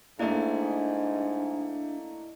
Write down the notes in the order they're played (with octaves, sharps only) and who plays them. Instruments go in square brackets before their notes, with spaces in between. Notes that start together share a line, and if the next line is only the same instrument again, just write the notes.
[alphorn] G#2 [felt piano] A3 A#3 [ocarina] D4 [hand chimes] E4 D5 D#5